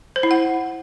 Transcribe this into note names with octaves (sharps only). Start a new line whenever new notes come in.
C5
E4
F#5